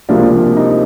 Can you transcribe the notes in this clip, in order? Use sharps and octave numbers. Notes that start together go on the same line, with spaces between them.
C#2 C3 F3 A#3 D4
D#4